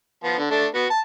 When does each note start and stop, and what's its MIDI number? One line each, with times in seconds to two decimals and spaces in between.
0.24 0.38 53
0.24 0.38 59
0.38 0.47 50
0.51 0.66 57
0.51 0.66 62
0.75 0.86 59
0.75 0.86 66
0.90 0.99 81